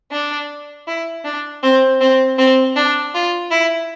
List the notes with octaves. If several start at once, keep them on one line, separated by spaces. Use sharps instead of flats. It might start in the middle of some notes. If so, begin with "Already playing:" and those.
D4
E4
D4
C4
C4
C4
D4
F4
E4